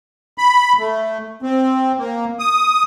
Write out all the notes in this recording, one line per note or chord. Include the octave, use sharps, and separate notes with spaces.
B5
A3
C4
A#3
D#6